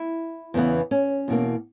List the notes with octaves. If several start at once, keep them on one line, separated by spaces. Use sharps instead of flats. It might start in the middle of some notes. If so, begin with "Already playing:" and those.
Already playing: E4
E2 C#3 E3 B3
C#4
E2 B2 A#3